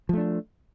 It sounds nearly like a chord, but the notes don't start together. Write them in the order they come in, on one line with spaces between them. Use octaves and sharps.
F3 A3 D4